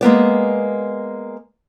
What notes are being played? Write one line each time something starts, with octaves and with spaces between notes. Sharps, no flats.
G#3 A#3 B3 D5